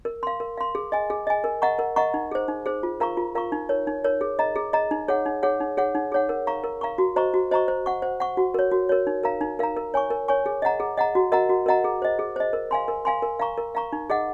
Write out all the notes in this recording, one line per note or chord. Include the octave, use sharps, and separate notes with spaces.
A#4
F5 C6
A#4
F5 C6
G#4
D#5 G#5
G#4
D#5 G#5
A#4
D#5 F#5 A#5 C#6
A#4
D#5 F#5 A#5 C#6
D#4
G#4 C5
D#4
G#4 C5
F4
A#4 F5 A#5 C#6
F4
A#4 F5 A#5 C#6
D#4
A#4 C#5
D#4
A#4 C#5
G#4
D#5 A#5
G#4
D#5 A#5
D#4
G#4 C#5 F#5
D#4
G#4 C#5 F#5
D#4
G#4 C#5 F#5
D#4
G#4 C#5 F#5
A#4
F5 A#5 C#6
A#4
F5 A#5 C#6
F#4
C5 D#5 A#5 C#6
F#4
C5 D#5 A#5 C#6
C5
F#5 C#6
C5
F#5 C#6
F#4
A#4 C#5
F#4
A#4 C#5
D#4
A#4 F5 A#5
D#4
A#4 F5 A#5
A#4
C#5 G#5 C#6
A#4
C#5 G#5 C#6
G#4
D#5 F#5 A#5
G#4
D#5 F#5 A#5
F#4
A#4 D#5 F#5 A#5
F#4
A#4 D#5 F#5 A#5
G#4
C5 D#5
G#4
C5 D#5
A#4
F5 G#5 C6
A#4
F5 G#5 C6
A#4
F5 A#5 C#6
A#4
F5 A#5 C#6
D#4
G#4 D#5 F#5